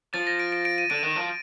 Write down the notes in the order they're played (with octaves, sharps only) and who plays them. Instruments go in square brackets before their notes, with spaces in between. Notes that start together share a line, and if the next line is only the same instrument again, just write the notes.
[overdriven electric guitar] F3 [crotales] A6
[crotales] A#6
D7
D7
D7
D#7
[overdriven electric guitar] D3 [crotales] D7
[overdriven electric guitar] D#3
F3